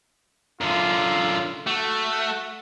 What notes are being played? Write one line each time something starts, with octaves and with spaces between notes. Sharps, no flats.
F#2 D3 F4
A3 F#4